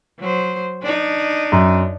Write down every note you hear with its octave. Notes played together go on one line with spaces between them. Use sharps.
F#3 C5
D4 D#4
F#2